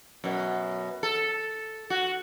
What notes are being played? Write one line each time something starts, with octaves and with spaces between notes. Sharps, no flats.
F#2 B2
A4
F#4